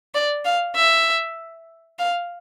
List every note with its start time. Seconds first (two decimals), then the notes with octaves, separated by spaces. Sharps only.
0.14 D5
0.45 F5
0.76 E5
1.99 F5